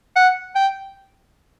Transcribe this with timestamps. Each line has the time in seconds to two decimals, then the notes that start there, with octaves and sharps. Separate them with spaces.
0.16 F#5
0.55 G5